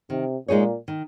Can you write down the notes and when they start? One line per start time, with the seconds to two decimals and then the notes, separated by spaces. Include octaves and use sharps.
0.10 C3 D#3
0.48 A#2 G#3 D#4 G#4 C#5
0.88 D#3